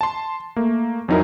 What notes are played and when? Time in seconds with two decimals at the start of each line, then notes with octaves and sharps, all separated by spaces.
0.01 A5 C6
0.56 A3 A#3
1.08 F2 F#3 D#4 E4 A#4